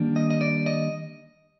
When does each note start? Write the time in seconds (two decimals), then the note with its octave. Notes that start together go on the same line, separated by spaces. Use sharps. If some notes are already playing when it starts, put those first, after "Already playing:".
Already playing: D#3 G3 A#3 D4
0.16 D#5
0.30 D#5
0.41 D5
0.66 D#5